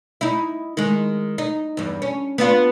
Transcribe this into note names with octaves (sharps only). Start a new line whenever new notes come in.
D#4 E4
D#3 G#3
D#4
E2 G2
C#4
B3 D4 F4